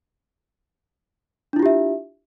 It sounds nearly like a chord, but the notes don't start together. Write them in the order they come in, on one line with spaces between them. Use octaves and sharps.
D4 E4 F4 G4 E5